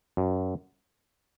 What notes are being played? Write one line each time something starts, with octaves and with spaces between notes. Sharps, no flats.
F#2